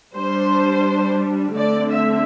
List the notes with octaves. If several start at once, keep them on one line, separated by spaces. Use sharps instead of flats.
G3 D4 C5
D3 A3 C4 D5
E5